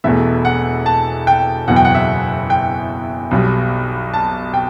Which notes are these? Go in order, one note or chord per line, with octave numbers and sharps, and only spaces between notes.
E1 E2 B2 A3 E5
F#5
A5
G5
F#1 E2 B2 F#5
G5
F#5
E5
G5
B1 B2 G3
A5
G5